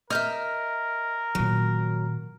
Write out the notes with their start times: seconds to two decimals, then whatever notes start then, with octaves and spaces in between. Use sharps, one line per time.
0.10 A#4 D#5 E5 F6 G6
1.35 A#2 D#3 F#3